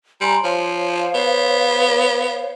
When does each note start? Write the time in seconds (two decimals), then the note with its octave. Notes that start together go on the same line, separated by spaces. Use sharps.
0.21 G3 G#5 A#5 C6
0.44 F3 C5 C#5 F5
1.14 B3